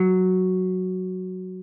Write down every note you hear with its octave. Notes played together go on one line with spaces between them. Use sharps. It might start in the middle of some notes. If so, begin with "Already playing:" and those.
Already playing: F#3